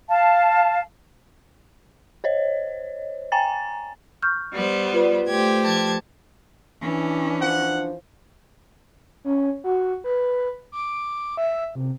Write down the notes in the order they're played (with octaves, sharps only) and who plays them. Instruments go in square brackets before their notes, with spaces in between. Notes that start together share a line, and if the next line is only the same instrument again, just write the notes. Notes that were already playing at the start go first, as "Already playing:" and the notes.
[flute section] F5 A5
[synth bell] C5 C#5 D#5
G5 G#5 A#5 A6
[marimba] C#6 F6 G6
[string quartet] G3 B3 C5
[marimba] F4 B4 D5
[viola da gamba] A3 G4 C5 [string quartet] G#6
[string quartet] F3 A5 G#6
[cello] E3 C#4 [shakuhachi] D4
[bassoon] F3 [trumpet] F#5
[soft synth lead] C#4
F#4
B4
D6
E5
C3